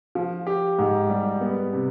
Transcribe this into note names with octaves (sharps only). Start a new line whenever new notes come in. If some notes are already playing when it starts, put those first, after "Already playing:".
F3
G4
G#2
G3
B3
C3